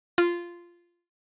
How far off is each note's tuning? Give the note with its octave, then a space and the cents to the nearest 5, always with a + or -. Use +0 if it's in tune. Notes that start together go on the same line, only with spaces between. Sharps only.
F4 -10